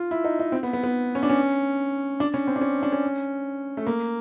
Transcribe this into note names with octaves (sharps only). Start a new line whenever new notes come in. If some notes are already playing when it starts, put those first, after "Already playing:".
Already playing: F4
E4
D#4
D#4
C4
B3
B3
B3
C#4
D4
C#4
D4
C#4
C4
D4
C#4
D4
C#4
A3
A#3